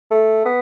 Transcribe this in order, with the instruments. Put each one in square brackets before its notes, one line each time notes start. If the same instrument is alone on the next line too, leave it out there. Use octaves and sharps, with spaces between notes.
[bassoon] A3
B3